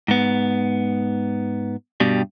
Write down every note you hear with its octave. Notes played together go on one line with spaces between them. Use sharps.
G#2 B3
G2 B2 G3